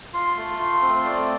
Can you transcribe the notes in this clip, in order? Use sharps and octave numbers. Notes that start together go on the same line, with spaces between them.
F4 C6
A3
F4 C6
C4
A3 D5